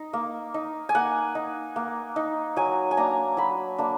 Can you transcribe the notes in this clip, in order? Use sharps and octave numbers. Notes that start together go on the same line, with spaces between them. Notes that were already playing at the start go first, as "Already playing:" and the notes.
Already playing: D#4
A#3
D#4
G#5
A#3 F#5
D#4
A#3
D#4
F#3 G#5
G#5
A#3 D4 A#5
F#3 B5
A#3 D4